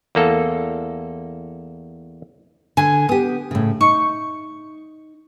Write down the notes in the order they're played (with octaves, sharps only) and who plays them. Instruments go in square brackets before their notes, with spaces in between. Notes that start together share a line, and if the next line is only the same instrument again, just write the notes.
[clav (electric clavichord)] E2 A#3 A4
[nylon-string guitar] D3 [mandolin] G#5
[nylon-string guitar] B3 G4 [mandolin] D#6
[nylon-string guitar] A2 C#3
[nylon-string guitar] D#4 [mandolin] C#6